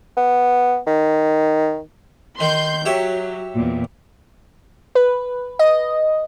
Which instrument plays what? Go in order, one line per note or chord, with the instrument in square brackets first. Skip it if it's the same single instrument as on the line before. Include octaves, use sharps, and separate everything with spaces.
[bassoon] B3
D#3
[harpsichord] D#3 [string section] C6 G6
[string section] F#3 [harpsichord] G4 C#5 E5
[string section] E2 A#2
[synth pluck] B4
D#5